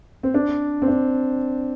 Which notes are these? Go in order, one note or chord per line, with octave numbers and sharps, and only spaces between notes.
C4
D4
C4
D4